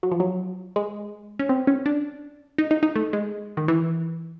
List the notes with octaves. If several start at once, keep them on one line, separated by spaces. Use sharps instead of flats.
F#3
F3
F#3
G#3
C#4
C4
C#4
D4
D#4
D#4
D#4
A3
G#3
D#3
E3